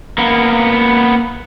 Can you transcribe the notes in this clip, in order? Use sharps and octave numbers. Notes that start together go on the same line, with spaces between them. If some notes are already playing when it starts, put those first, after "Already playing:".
A#3 B3